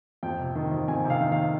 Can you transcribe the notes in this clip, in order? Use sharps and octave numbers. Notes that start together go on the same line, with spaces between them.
F2 G5
C3
D#3
F2
F2 G#5
C3
F5
D#3
F5